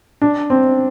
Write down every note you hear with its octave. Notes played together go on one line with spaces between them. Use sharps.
D4
C4